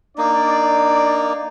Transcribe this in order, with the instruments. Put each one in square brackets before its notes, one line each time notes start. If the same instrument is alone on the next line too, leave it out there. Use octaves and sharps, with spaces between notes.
[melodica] A#3 D#4 [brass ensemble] D4 D5